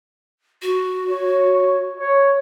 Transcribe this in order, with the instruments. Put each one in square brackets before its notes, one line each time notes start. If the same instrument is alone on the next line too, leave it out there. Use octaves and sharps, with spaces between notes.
[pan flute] F#4
[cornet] C#5
C#5